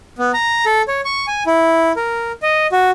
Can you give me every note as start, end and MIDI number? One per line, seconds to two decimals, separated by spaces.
0.19 0.32 59
0.34 0.65 82
0.66 0.82 69
0.88 1.01 73
1.05 1.26 85
1.28 1.43 80
1.47 1.92 64
1.96 2.32 70
2.42 2.67 75
2.72 2.91 66